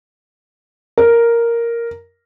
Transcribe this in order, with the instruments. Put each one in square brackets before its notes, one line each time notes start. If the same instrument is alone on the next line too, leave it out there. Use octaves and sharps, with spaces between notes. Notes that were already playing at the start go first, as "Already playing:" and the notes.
[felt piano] A#4